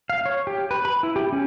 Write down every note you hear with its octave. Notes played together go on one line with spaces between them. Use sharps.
F5
C#5
G4
B4
B5
E4
G4
C#4